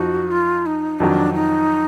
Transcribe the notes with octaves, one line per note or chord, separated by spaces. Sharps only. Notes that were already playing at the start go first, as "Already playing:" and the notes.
Already playing: F2 F3 D#4 F#4
F4
D#4
F2 D#3 F#3 D4
D#4